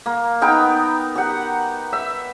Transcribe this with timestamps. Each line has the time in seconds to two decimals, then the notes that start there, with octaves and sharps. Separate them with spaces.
0.06 A#3
0.42 B3 D#4 A#4 G5
1.16 G4 F#5
1.93 E5